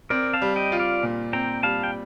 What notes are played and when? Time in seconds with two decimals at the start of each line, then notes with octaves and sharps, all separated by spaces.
0.10 C4 A#4 D5
0.34 F5 A5
0.42 G3
0.56 D#5 G5
0.72 F4
0.79 D5 F5
1.03 A#2
1.33 C4 G5 A#5
1.63 G3 F5 A5
1.83 G5